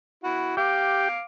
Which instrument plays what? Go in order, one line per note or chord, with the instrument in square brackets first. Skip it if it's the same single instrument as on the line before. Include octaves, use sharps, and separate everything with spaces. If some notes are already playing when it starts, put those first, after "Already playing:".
[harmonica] E4 F#4
[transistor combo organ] G4 [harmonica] F5 D6